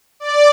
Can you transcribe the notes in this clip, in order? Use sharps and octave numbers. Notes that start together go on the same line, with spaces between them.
D5